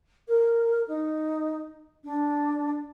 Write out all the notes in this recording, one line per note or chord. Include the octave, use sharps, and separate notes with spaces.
A#4
D#4
D4